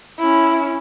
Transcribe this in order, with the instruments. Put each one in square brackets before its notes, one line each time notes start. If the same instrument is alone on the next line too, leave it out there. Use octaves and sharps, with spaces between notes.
[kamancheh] C#4 E4